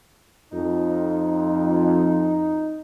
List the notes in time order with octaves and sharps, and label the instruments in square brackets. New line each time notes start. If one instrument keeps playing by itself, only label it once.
[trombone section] F2 [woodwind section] D#4